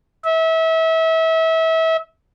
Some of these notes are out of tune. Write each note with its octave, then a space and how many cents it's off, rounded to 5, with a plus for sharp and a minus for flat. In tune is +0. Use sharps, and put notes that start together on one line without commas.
E5 -30